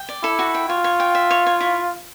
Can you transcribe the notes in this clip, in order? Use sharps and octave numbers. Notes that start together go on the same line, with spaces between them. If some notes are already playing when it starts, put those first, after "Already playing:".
Already playing: G5
D5
E4 A4
F#4
G5
F4 C#5
C#5
G5
E5
C#5
C#5
E4